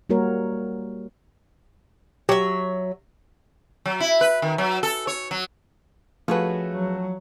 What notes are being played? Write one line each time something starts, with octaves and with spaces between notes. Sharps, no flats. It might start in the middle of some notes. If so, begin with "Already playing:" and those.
G3 A#3 F#4 A#4 C#5
F#3 G4 E5
F#3
E4
B4
D#3
F#3
A4
C#5
F#3
F3 A3 C#4 F#4 G#4 B4
F#3